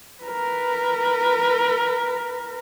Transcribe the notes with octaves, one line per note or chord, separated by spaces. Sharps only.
A#4 B4